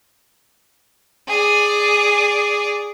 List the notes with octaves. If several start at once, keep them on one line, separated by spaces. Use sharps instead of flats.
G#4 D5